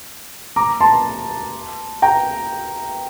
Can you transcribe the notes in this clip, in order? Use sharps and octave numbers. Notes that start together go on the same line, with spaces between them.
A#5 D6
A5 C6
G5 A#5